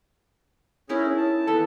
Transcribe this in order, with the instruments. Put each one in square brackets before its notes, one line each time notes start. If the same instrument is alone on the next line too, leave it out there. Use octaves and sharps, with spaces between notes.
[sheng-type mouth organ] C#4 G#4 [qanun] D#4 E4 A#4
[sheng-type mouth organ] A5
[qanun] E3 B3 [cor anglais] A4